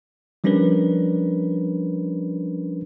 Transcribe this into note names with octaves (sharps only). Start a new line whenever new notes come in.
F3 G3 C#4 D4 A#4 B4